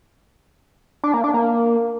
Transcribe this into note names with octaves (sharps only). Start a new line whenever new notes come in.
D4
A#3
D4
A#3